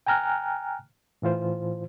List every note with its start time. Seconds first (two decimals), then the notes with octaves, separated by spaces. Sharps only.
0.07 G5 G#5 A#5 F6 F#6
1.22 A2 E3 F4 C5